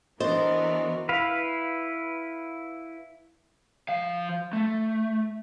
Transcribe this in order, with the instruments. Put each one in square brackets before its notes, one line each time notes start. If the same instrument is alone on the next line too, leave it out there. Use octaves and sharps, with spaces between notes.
[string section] E3 B3 A#4 [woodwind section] D4 F#4 [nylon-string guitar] C5 [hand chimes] D#5
[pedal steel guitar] E4 B4 F5
[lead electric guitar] F3 F5
A3